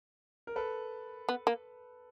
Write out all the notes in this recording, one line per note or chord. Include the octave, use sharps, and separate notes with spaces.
A#4
A4 B4
B3
A#3